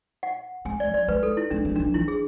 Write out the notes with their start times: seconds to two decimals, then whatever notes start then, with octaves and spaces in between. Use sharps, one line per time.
0.23 F#5
0.65 G#3 G#5
0.80 D5
0.88 F#3
0.94 D5
1.08 G#3 B4
1.23 A4
1.37 E4
1.50 G#3 D4
1.65 F#3
1.76 D4
1.80 F#3
1.94 E3 E4
2.08 G#4